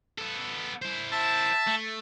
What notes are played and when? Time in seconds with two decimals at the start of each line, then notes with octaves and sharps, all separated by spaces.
0.18 B3 A4
0.82 E4 C5
1.11 E5 A5
1.67 A3